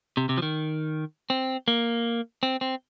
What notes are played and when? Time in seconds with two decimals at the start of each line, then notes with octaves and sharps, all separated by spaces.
0.17 C3
0.29 C3
0.38 F3
0.42 D#3
1.30 C4
1.68 A#3
2.43 C4
2.61 C4